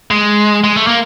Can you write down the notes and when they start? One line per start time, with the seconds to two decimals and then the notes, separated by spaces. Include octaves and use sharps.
0.11 G#3
0.64 G#3
0.76 A3
0.87 A#3